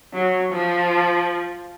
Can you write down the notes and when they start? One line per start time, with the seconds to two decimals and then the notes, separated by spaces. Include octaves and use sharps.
0.14 F#3
0.52 F3